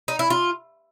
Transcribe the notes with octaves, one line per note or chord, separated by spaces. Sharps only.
D#4
E4
F4